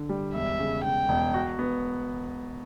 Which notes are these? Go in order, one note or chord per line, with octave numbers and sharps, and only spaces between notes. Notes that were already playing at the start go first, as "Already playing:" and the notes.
Already playing: D3 D4
G3
E1 E5
C#3
C#3 G5
E1
F#4
B3